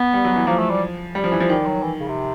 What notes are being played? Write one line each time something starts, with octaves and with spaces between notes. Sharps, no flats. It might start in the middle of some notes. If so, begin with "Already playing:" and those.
Already playing: B3
G3
F#3
E3
F3 A#3
A3
G3
G3
F3
E3
F3
D#3 G3
F#3
E3
C#3
C3